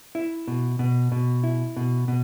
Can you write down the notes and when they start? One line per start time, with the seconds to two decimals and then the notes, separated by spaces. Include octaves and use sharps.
0.15 E4
0.48 B2
0.79 B2
1.12 B2
1.43 E4
1.76 B2
2.08 B2